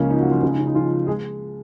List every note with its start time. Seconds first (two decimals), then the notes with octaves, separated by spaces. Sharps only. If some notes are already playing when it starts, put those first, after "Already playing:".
Already playing: C#2 C#3 F3 A#3 C#4
0.10 D#4
0.20 F#3 F#4
0.31 F3 F4
0.42 C#2 C#3 G#3 C#4
0.50 D#4
0.59 C#4
0.67 D#4
0.75 F3 F4
1.07 G#3 G#4